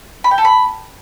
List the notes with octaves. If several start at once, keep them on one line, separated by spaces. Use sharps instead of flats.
B5
G5
A4
B5